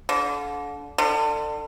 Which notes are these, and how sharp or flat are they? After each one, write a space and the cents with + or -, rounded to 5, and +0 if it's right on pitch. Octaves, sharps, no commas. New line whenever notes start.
D3 -30
D3 +30